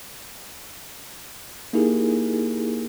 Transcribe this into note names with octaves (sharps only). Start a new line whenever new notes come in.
A#3 D#4 E4 G4 G#4 A#4